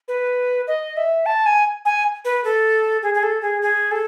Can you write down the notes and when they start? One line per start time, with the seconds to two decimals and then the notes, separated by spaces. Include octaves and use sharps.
0.08 B4
0.68 D#5
0.97 E5
1.26 A5
1.46 G#5
1.85 G#5
2.25 B4
2.44 A4
3.03 G#4
3.14 G#4
3.23 A4
3.42 G#4
3.62 G#4
3.91 A4